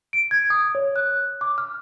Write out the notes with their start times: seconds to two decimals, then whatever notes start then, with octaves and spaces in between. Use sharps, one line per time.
0.13 D7
0.31 G#6
0.50 D#6
0.75 C#5
0.96 F#6
1.41 D6
1.58 F6